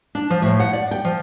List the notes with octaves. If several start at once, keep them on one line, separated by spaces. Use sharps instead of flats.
D4
F3
A2
F#5
D5
G5
F3